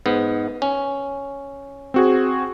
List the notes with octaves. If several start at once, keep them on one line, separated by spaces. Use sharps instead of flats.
G#2 B3
C#4
C4 F#4 G#4